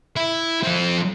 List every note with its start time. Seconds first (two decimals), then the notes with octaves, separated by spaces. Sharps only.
0.16 E4
0.63 F3 C4